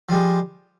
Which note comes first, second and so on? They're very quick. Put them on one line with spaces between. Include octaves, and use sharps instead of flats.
F3 G3 G#3